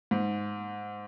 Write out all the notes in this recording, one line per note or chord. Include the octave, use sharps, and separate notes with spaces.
G#2